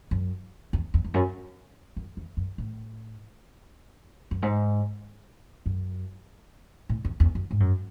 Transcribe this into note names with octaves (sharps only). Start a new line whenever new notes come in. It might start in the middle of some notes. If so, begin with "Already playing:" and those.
F#2
E2
E2
E2
F#2
F#2
E2
F#2
A2
F#2
G#2
F#2
A2
E2
E2
F#2
G#2
F#2